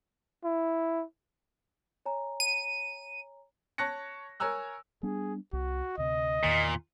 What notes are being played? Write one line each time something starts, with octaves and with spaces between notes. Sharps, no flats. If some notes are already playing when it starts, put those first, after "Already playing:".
E4
C#5 G#5 A#5
D#7
C#5 A5 C#6 F#6 A#6 C#7
A#4 C#5 G#5 A#5 E6 F#6
G3 B3 D4 G#4
C2 F#4
D2 C3 D#5
E2 A#2 D#3